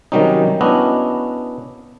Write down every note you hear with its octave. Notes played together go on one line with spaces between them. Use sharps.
C3 D#3 F#3 G3 C#4 D#4
B3 C#4 D4 E4 F#4 D#5